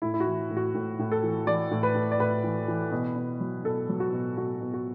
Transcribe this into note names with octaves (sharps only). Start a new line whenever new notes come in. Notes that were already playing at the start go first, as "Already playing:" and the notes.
A2 E4
E4
F#4
E3
A2
F#4
A2
A2
A4
E3
E3 D5
A2
B4
A2
D5
A2 B4
E3
E3
B2
B2
F#3
B2 A4
F#3
F#4
B2
B2 F#4
B2
F#4